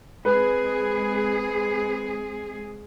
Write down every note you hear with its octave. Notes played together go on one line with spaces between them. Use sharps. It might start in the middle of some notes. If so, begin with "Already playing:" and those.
G#3 C4 G#4 B4